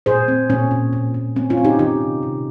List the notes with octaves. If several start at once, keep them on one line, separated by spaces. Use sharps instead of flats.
A#2 G#4 C5
C4
A#2 C#4
A#2
A#2
A#2
C4 C#4
C#4 F4
C4
D#4 G4
D#3 D#4 G4
C3
C3